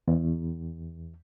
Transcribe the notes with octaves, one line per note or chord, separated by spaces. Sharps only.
E2